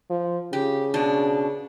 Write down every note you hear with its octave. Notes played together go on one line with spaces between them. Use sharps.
F3
C#3 G4
B2 D4